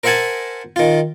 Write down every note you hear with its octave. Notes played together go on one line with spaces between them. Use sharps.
A#4 C5 E5 F#5 G#5 A5
D#3 F4